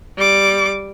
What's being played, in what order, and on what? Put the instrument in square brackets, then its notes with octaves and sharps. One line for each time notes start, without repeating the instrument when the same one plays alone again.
[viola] G3 D6